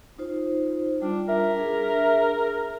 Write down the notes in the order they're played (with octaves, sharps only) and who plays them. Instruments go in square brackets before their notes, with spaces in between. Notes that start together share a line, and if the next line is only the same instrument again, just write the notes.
[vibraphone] D#4 F4 C5
[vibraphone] G3 F4 [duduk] D4
[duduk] A#4 [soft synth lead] E5
[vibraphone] D4 G#4